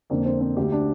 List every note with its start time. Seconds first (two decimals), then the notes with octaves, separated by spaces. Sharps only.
0.10 F2 D3 A#3
0.26 C4
0.41 C4
0.57 D2 D3 G4
0.72 D4